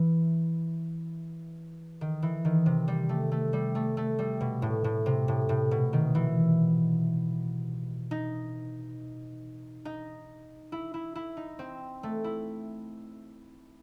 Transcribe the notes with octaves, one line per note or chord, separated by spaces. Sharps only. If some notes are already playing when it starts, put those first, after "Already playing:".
Already playing: E3
D#3
E3
D#3
C3
G3
A3
A3
G3
A3
A3
G3
B2
A2
A2
C3
A2
A2
B2
D#3
E3
D#4
D#4
E4
E4
E4
D#4
C4
A3
E4